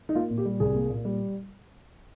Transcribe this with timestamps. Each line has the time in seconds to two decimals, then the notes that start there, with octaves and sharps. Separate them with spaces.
0.09 D#4
0.15 A#3 F4
0.30 A#2
0.38 G4
0.45 G3
0.60 C2 G#4
0.75 A#3
0.90 A#2
1.05 G3